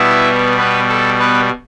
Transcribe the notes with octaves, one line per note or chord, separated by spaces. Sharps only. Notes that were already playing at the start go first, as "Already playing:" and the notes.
Already playing: B2 G3 B3 E4 E5
B3 B4
A4
B3 B4